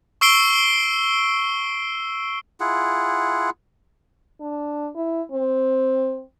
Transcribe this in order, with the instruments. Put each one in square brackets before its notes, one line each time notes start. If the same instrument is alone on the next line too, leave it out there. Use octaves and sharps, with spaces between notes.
[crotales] C#6 E6 C7 D7 G7
[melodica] E4 F4 G#4 F#5
[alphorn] D4
E4
C4